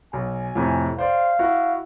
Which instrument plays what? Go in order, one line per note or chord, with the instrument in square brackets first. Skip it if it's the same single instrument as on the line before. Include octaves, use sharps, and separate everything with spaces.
[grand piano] B1 [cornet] G#5
[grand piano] F2 A2 C3
[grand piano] C5 D5 [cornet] F5
[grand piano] E4 F#4